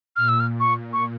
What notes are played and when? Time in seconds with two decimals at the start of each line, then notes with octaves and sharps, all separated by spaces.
0.16 A#2 F6
0.29 E6
0.40 F6
0.46 A#2
0.60 C#6
0.75 A#2
0.93 C#6